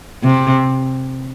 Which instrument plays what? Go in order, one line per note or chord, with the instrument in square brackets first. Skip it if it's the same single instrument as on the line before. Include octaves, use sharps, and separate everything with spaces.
[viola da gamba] C3